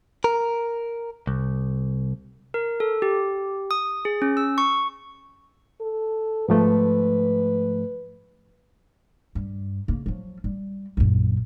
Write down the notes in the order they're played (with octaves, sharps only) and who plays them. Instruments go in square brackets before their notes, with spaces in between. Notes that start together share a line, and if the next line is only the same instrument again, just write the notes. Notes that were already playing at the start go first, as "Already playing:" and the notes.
[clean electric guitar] A#4
C2
[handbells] A#4
A4
G4
D#6
G#4
C#4
E6
C#6
[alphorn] A4
[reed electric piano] G#2 F3 A3 [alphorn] B4
[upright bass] G2
C#3 A#3
F3 F#3
G3
A#1 F#2